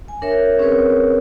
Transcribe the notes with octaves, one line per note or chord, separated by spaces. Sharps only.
G#5
D4 A#4 C#5 E5
C4 C#4 G#4 A#4 B4 C#5